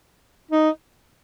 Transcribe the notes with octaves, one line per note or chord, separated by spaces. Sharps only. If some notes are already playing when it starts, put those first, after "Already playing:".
D#4